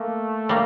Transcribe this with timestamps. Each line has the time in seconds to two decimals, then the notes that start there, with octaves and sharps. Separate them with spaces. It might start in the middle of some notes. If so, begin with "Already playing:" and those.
Already playing: A3 A#3
0.49 G3 A#3